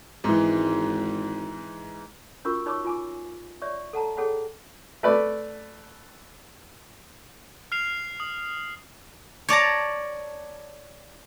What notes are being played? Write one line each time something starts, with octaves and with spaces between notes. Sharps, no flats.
G#1 G#2 E3
C#4 F4 F#4 A#4 C#6 E6
D#4 C#5 B5 C#6 D6 E6
F4 G#5 D6
C#5 D5 E5 C#6
A4 F#5 A5 A#5
G#4 A4 C#5 F#5 G5 B5
A3 B4 D5
F6 C7 F7
D#6
C#5 D5 A5 A#5